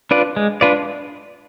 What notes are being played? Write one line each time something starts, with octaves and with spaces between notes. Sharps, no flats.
D4 F4 B4 D5
G#3
D4 F4 B4 D5